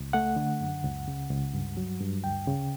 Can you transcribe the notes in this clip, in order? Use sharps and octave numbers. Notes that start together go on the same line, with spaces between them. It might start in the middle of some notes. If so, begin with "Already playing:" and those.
Already playing: C#2
A3 F#5
D3
F#2
C#2
C#3
C#2
G2
F#3
G2
D2 G5
C#3